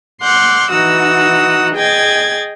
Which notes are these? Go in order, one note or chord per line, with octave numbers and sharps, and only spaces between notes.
F#5 C6 D6 F6 G6
E3 D#4 F#4 F#5 D#6 E6
G#4 D#5 G5 G#6 A6